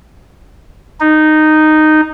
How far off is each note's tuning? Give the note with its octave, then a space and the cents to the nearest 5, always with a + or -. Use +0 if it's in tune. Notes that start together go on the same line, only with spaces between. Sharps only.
D#4 -10